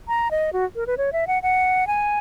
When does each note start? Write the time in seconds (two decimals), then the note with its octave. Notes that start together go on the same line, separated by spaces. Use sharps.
0.08 A#5
0.31 D#5
0.53 F#4
0.76 A#4
0.87 B4
0.98 C#5
1.13 E5
1.27 F#5
1.43 F#5
1.87 G#5